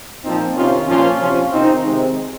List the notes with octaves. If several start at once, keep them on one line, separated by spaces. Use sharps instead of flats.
A#2 F3 C4 D#4
C3 D#3 C#4 F4
A#2 F3 C#4 F4
C3 F3 C#4 F4
C3 D#3 C4 D#4
C3 D#3 G#3 C4